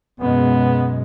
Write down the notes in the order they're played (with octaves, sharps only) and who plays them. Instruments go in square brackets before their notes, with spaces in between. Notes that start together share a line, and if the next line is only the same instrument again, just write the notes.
[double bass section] F#2 B2 G#3 [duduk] B3